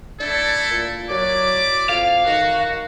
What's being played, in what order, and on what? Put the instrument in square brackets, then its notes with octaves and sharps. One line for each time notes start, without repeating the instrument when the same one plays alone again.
[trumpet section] A3 E4 A4 [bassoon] D4
[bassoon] A#2
[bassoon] F#3 [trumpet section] E4 D5 D6
[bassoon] F2 [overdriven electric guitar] F5
[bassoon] D#3 [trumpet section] F#4